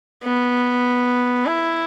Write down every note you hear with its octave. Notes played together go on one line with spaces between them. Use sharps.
B3
E4